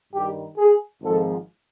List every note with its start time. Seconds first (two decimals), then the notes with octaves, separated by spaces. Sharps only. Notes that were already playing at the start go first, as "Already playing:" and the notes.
0.13 G2 D#3 G3 G4
0.58 G#4
1.01 G#1 G#2 F3 G#3 A4